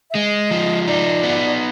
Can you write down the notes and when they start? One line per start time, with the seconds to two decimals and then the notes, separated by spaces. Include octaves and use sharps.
0.10 E5
0.15 G#3 D#5
0.51 F3
0.87 D#4 D5
1.23 B3